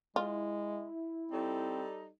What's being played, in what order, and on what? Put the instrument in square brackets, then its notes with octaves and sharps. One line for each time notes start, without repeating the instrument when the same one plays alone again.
[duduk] G#3 [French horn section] E4 [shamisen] F4
[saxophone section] G3 D#4 A4 [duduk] C4